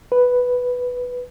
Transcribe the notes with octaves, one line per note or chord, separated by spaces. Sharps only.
B4